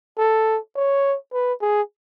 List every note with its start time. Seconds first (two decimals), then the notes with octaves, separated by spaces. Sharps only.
0.18 A4
0.76 C#5
1.33 B4
1.62 G#4